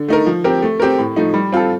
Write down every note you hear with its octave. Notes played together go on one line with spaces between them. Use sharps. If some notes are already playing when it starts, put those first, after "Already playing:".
Already playing: D3
A3 D#4 A#4
F3
C4 G4 A#4
A3
C4 G4 A#4
A2
F3 A3 D#4
G3
C4 F4 A4